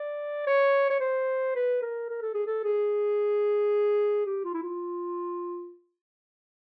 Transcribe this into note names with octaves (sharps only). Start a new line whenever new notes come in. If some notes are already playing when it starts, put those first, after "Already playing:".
Already playing: D5
C#5
C#5
C5
B4
A#4
A#4
A4
G#4
A4
G#4
G4
F4
E4
F4